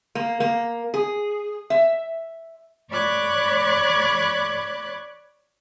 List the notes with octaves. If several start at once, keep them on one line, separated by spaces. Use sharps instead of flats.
A#3
A#3
G#4
E5
C#5 D5 B5 D6 F#6 G#6